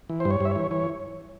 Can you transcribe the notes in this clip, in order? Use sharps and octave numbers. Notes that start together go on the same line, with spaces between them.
E3
G2 C5
C#5
G2 E5
E3 C#5
E3 C#5